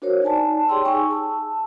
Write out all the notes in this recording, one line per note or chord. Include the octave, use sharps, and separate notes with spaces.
D4 F#4 A#4 C5 C#5
D#4 D5 G#5 A5
G4 G#4 C#5 G5 C6 E6
D#4 G#4 G#5 C#6 E6
A5 E6